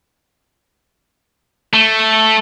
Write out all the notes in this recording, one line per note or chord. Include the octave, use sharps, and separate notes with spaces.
A3